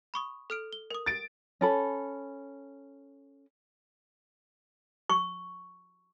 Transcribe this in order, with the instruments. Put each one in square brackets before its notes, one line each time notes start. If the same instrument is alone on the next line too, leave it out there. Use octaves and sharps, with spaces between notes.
[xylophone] B5 C#6 D#6
A4 F6 D7
G7
A#4 D#6
[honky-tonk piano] A6 D7
[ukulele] C#4 A4 B5
[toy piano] C#6